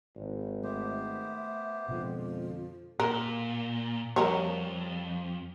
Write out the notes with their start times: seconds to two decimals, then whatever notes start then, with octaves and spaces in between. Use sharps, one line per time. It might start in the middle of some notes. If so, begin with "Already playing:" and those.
0.16 G#1
0.63 A3 B3 G4 C5 E5
1.88 F2 B2 D3 G#3 F4
3.00 A#2 A#4
4.16 F2 G3 A#4 C#5